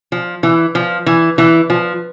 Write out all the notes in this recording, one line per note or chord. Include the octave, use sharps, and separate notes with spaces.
F3
E3
F3
E3
E3
F3